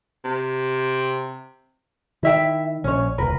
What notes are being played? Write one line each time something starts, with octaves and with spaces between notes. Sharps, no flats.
C3
D#3 E4 E5 G5
A#1 C#4 C#5
E1 C#2 A#4 B4